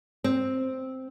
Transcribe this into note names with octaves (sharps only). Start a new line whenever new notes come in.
C4